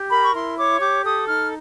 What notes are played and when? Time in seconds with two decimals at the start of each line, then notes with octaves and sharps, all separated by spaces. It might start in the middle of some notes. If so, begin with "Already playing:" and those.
Already playing: G4
0.10 A#4 B5
0.24 C#6
0.34 E4 C6
0.57 C#5 D6
0.81 G4 D6
1.04 A4 D#6
1.27 D#4 F6